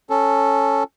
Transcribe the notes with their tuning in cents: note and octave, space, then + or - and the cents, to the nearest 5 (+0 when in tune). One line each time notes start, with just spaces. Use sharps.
C#4 -5 A4 +0